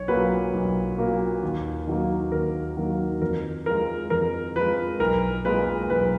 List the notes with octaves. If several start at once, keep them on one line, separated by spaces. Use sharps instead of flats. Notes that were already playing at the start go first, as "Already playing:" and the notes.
Already playing: B1 C#5
A#2 F#3 A#3 B4
B1
A#2 F#3 A#3
D#2
D#3 F#3 A#3
D#2 A#4
D#3 F#3 A#3
F2 A#4
F3 G#3 A#4
F2 A#4
F3 G#3 B4
B1 A#4
A#2 G#3 B4
B1 B4